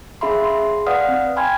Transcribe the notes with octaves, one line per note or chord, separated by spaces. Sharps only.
C#4 G#4 E5 F5 B5 C6
G#4 C6
B4 D5 F5 F#5 D#6 F6
C4
G5 G#5 B5 C6 F6 G#6